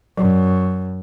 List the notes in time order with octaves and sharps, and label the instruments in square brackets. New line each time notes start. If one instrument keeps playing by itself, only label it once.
[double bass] F#2 [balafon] F#3